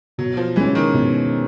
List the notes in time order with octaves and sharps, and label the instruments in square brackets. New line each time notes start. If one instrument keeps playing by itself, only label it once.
[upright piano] B2 [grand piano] F#3
[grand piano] F3
[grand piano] E3 [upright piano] G#3 C#4
[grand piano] D#3
[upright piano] B2